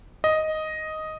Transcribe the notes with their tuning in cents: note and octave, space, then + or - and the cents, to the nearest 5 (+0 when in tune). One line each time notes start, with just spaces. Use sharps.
D#5 +5